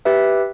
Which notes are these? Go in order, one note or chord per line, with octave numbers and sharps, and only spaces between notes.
G4 B4 E5